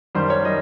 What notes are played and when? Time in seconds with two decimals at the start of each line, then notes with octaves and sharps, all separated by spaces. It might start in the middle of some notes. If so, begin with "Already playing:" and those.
0.15 F#2 D#3 G3 C5
0.30 C#5
0.45 G3 D#5